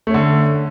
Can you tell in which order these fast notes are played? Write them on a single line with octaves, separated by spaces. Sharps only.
A3 C#4 D3